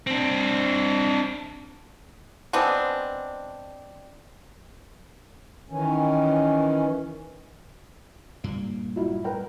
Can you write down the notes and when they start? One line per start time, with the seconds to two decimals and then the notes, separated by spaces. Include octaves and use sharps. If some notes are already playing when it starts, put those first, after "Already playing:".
0.07 C4 D4
2.53 G#3 B3 C4 D4
5.70 D#3 E3 C#4
8.44 G2 A#2 A#3
8.96 F#3 E4 F4
9.24 A#4 B4 G5